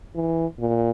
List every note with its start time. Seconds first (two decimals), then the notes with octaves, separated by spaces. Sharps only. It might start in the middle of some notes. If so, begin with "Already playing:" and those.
0.15 E3
0.59 A#2